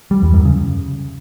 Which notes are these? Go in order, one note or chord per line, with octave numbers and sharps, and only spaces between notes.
G3
E2
F#2
C#3